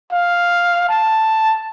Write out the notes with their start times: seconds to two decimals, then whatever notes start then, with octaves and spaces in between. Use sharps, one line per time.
0.12 F5
0.89 A5